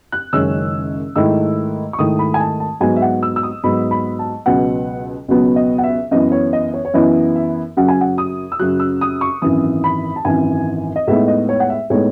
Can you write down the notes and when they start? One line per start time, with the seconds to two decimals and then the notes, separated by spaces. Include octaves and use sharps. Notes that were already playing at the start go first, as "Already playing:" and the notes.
0.12 F#6
0.33 F#1 F#2 D#3 G#3 C#4 E6
1.16 G#2 D#3 A3 E4 E6
1.93 C#6
1.98 G#2 D#3 A3 E4 D#6
2.19 B5
2.34 G#5
2.40 A5
2.60 A5
2.81 G#2 F#3 B3 G#5
2.96 E5
3.02 F#5
3.23 E6
3.36 E6
3.43 D#6
3.64 G#2 F#3 B3 B5
3.91 B5
4.19 A5
4.46 C#2 B2 F#3 B3 F#5
5.28 C#2 B2 F#3 B3
5.56 D#5
5.78 F#5
5.84 E5
6.11 F#2 E3 B3 E4 D#5
6.32 C#5
6.53 D#5
6.74 C#5
6.85 C#5
6.94 F#2 E3 B3 E4 D#5
7.36 E5
7.77 F#2 C#3 F#3 F#5
7.88 G#5
8.01 F#5
8.18 D#6
8.52 E6
8.59 F#2 C#3 F#3 F#6
8.80 E6
9.01 D#6
9.21 C#6
9.42 G#1 F#2 E3 D#6
9.84 B5
10.16 A5
10.25 G#1 F#2 E3 G#5
10.96 D#5
11.07 A2 G#3 B3 D#4 E5
11.28 D#5
11.49 C#5
11.60 F#5
11.70 E5
11.90 A2 G#3 B3 D#4 C#5